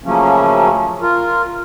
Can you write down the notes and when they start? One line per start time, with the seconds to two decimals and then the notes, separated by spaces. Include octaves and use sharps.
0.04 C#3 F3 F#3 A3 A#3 C#4
1.02 F4 A#4